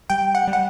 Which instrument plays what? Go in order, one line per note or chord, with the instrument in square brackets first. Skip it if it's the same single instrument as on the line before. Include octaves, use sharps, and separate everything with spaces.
[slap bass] G3 [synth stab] G5
[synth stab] F#5
[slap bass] G3
[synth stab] F#5